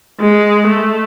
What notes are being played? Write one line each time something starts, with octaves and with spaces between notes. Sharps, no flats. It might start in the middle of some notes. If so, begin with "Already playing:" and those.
G#3
A3